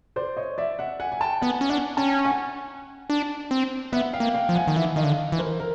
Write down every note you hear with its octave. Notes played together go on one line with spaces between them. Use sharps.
C5 D5
C#5 D#5
D5 E5
E5 F#5
F#5 G#5
G#5
G5 A5
B3 F#5 G#5
C#4
D4 F#5 G#5
C#4 G5 A5
F#5 G#5
D4
C4
B3 E5 F#5
F5 G5
A#3
F5 G5
F3
F#5 G#5
D#3
E3 E5 F#5
D#3 D#5 F5
D3
E3
A#4 C5
A#4